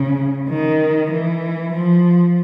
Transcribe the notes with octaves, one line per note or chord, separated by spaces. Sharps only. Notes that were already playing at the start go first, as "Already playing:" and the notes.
Already playing: C#3
D#3
E3
F3